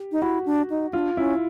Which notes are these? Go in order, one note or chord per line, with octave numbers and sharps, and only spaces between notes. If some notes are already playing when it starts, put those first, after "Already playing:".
Already playing: G4
D#4
E4 F#4
D4
D#4
D4 F4
C#4 E4